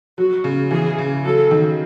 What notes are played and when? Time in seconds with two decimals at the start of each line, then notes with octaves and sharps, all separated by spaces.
0.18 F#3 F#4
0.44 C#3
0.71 E3 G#4
0.98 C#3
1.25 F#3 A4
1.51 D#3